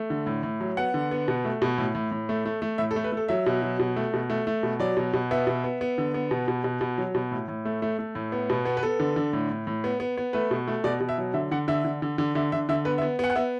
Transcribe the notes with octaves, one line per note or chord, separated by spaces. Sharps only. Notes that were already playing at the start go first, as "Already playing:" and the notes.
Already playing: A3
D3
A2
A2
F#3
B3 F#5
D3
B3
B2
A3
B2
A2
A2
A2
A3
A3
A3
A2 E5
A4
A3
B4
A3 A4
F#3 E5
B2
F#3
B2
A3
B2
A3
A3
B2
F#3 D5
B2
B2
B3 E5
B2
B3
B3
D3
B3
B2
B2
B2
B2
F#3
B2
A2
A2
A3
A3
A3
A2
B3
B2
B3
B4
B3 A4
D3
D3
A2
A2
A2
B3
B3
B3
A3 B4
B2
A3
B2 D5
B2
E5
F#3
D3 E5
D3 F#5
D3 E5
D3
D3
D3
D3 E5
D3 E5
D3 E5
B3 B4
E5
B3
B3 F#5
F#5
B3 E5